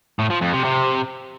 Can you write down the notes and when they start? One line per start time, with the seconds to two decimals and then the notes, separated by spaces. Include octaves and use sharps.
0.19 A2
0.30 F3
0.42 F2
0.53 C3
0.65 C3